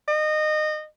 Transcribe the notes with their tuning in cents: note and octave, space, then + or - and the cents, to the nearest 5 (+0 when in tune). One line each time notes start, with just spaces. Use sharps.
D#5 -25